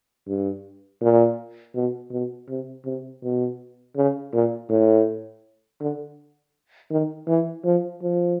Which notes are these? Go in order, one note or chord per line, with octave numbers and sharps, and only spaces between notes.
G2
A#2
B2
B2
C3
C3
B2
C#3
A#2
A2
D3
D#3
E3
F3
F3